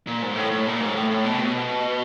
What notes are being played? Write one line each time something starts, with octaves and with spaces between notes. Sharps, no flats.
A#2
G#2
A2
A2
A#2
G#2
A2
A2
B2
C3
B2